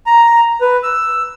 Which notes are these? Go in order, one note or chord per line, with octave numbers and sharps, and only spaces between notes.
A#5
B4
E6